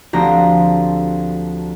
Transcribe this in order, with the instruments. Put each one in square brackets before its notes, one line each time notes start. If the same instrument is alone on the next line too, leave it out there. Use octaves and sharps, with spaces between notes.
[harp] D2 F3 C4 F#4 G4 A#5